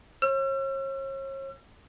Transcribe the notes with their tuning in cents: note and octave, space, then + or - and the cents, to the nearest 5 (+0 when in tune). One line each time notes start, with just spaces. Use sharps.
C#5 -40 E6 +45